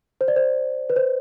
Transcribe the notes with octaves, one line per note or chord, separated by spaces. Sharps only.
C5
D5
C5
B4
C5